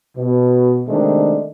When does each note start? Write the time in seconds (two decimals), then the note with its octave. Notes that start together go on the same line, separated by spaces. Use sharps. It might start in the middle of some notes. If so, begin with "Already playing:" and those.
0.17 B2
0.88 C3 D#3 G#3 A3 D4